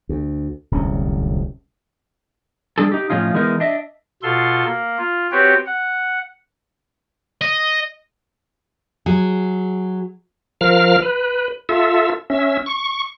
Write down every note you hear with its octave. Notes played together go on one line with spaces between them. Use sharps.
D2
D1 C2 F2 C#4
G3 D4 G#4 A4
D#4 G4
A2 F3 C#4 D#4 F4
E3 G#3 B3 D#4 A#4
D4 D#5 E5
B2 F4 A4 C6
A#3
F4
C4 F#4 G4 B4 C#5 G5
F#5
D#5
F#3 G#4
F3 A#4 F5 F6
B4
F4 A4 E5
C#4 E5
C#6